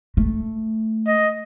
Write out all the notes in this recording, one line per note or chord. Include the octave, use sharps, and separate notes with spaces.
A3
D#5